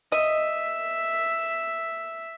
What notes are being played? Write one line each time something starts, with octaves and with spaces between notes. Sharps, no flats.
D#5 E5